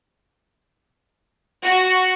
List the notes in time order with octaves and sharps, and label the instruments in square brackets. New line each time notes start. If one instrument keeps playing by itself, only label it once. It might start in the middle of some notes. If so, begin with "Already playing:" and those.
[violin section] F#4